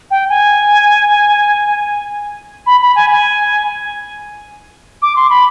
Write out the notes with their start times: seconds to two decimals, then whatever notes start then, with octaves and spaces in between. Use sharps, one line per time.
0.11 G5
0.29 G#5
2.67 B5
2.82 B5
2.96 G#5
3.11 G#5
5.02 D6
5.16 C6
5.30 B5